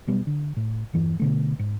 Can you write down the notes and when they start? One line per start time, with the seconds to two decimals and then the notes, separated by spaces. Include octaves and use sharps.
0.07 B2 F#3 G3 B3
0.27 D3
0.57 A2
0.93 E2 G2 E3
1.20 B2 D3 A3
1.59 G#2